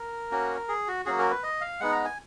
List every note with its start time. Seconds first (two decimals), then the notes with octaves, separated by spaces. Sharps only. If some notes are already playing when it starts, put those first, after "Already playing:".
Already playing: A#4
0.31 A#3 C#4 F#4
0.69 G#4
0.88 F#4
1.05 F#3 A#3 C#4 F#4 G#4
1.19 A#4
1.30 B4
1.43 D#5
1.61 F5
1.80 G#3 B3 D#4 F#5
1.92 A#5
2.05 G#5